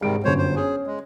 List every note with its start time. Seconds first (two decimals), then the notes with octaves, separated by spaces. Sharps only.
0.02 G#2 C3 D#3 G3 D7
0.25 G1 F#2 C5 C#5
0.38 C5
0.56 C#4 G#4
0.86 G#3